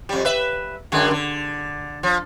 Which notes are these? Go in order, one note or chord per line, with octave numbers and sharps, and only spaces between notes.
F2 G3
B4 E5
F#2 D3 G#3
D3
F3